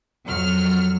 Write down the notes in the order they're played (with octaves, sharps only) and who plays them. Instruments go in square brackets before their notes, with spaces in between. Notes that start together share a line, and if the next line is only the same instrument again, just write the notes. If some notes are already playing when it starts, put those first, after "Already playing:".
[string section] F2 F#3 F6